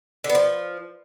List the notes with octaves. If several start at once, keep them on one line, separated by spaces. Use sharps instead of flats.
D3
B3
F3